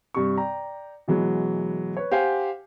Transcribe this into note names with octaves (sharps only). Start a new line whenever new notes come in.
G2 C3 C#6
D5 G5 A#5
B2 E3 F#3 G#3
B4 C#5
G4 C5 F5 F#5 G#5